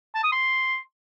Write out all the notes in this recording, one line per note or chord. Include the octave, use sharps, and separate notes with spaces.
A5
D#6
C6